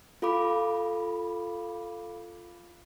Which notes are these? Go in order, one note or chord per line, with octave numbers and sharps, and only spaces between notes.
F4 A4 F5 B5 D6